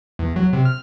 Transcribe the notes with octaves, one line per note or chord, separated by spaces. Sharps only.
E2
F#3
C3
F6